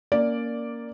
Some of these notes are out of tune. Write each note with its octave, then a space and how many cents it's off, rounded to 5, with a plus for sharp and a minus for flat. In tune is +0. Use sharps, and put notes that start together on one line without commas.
A#3 +0 C#4 +25 D5 +0